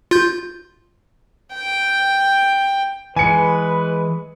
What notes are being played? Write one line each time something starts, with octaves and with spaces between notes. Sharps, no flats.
F4 G6
G5
E3 G#3 B4 G#5 C#7